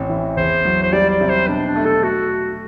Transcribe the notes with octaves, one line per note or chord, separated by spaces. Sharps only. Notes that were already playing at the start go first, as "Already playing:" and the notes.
Already playing: A1 C4
E3
E2 C5
F#3
C5
G3 D5
D5
C3
C5
B2 D4
D4
A3
A4
A3 F#4